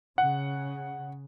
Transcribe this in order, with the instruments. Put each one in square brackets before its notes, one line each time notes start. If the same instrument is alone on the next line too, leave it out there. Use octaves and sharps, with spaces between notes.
[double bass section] C#3 [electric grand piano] F#5